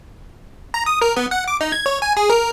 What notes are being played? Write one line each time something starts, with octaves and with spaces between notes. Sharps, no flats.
A#5
D#6
A#4
B3
F#5
D6
D#4
G#6
C#5
G#5
G#4
A#4